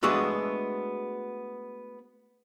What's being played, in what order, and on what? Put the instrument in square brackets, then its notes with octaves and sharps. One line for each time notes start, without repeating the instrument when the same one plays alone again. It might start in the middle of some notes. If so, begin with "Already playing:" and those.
[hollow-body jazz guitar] G#3 A3 B3 D4 F#4 G#4